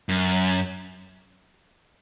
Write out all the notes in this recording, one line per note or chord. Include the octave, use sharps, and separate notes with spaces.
F#2